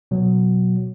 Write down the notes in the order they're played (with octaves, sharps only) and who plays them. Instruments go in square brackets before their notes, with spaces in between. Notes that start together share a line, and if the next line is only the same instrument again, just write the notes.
[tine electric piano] B2 F#3